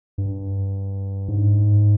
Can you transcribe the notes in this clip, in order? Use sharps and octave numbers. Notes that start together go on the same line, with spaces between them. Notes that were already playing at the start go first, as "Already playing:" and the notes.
G2
G#2